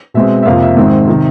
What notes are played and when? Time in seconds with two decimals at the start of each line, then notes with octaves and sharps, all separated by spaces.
0.14 B2 G#3 C4 E5
0.42 E5
0.45 F2 C3 F3 A#3 F5
0.62 E5
0.76 G#2 D#3 G#3 C4 E5
1.08 C3 D#3